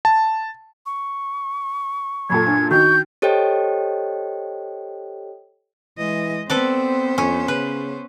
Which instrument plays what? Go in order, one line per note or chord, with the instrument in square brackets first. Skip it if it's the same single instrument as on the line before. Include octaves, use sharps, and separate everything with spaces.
[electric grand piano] A5
[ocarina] C#6
[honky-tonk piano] F#2 A#2 A4 [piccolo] G#6
[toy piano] D4
[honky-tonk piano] D#3 [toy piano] F#4 [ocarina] C#6 [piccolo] G6
[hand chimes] G4 A4 C5 C#5 D#5 G5
[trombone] E3 [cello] G#3 D#5
[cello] B3 C5 [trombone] C4 [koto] A4 B4 D5
[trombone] F2 [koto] C#4
[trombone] C#3 [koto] B4